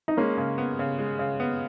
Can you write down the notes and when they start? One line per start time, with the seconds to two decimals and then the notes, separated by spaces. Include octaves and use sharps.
0.08 D#4
0.17 G#3 A#3 C#4
0.37 C#3
0.58 B3
0.79 C#3
0.99 G#3
1.19 C#3
1.40 B3